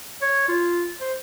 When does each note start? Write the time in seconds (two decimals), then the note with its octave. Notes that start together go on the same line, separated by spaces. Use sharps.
0.22 C#5
0.49 F4
1.01 C5